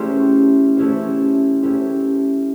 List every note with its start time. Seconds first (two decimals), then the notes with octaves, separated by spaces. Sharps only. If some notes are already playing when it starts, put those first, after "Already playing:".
Already playing: A3 C#4 E4 G4 C5
0.77 A3 C#4 E4 G4 C5
1.62 A3 C#4 E4 G4 C5